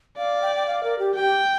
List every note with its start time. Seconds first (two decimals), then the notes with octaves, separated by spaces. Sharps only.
0.17 D5 F5
0.42 G5
0.55 G5
0.67 F5
0.84 A#4
0.99 G4
1.16 G4 G5